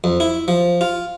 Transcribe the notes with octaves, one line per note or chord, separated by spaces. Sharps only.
F2
E4
F3
F4